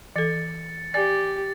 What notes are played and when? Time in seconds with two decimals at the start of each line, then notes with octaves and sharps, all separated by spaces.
0.16 E3 A4 A6 C#7
0.94 G4 D5 G#5 A6